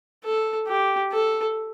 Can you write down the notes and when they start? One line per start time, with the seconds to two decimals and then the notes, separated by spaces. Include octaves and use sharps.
0.25 A4
0.68 G4
1.12 A4